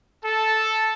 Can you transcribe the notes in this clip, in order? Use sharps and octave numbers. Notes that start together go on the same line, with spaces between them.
A4